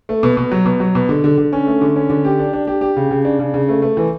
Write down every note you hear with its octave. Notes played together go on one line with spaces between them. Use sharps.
A3
B2
B2
F#3
B2
F#3
B2
D3
D3
D3
C#4
A3
D3
C#4
D3
G4
D4
D4
G4
G4
C#3
C#3
D4
C#3
C#3
A3
A3
E3